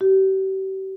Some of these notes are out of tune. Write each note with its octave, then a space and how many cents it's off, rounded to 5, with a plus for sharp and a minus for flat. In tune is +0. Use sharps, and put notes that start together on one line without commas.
G4 -40